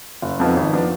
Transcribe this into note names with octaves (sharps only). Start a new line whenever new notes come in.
F#1
F2 F3 B3 D#4
G#1
F3 B3 D4